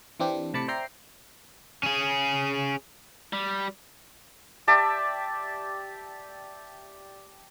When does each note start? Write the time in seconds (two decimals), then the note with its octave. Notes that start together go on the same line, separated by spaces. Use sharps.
0.20 E3 C4 D4 G4
0.53 A2 C3 A5 B5 D6 C#7
0.68 C5 D5 E5 G5 A#5 C7
1.83 C#4 G#4
3.33 G3
4.67 G4 D5 E5 A5